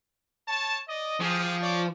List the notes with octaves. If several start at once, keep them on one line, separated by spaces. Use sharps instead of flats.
C#5 A5
D5 D#5
F3 G4 G#4
C#5 D5 D6